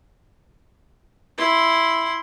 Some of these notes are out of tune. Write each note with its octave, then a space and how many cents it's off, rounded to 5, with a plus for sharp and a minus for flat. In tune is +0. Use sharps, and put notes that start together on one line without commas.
E4 +0 C6 +0